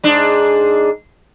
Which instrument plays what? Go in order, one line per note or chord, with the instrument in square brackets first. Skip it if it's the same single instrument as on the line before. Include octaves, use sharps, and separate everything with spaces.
[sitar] G#2 D4